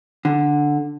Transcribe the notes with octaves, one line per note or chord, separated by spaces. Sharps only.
D3